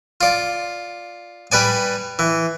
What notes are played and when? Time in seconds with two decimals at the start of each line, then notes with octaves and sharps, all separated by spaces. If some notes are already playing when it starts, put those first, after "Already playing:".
0.21 F4 D5
1.52 G3 B4 D5 G#5
2.19 E3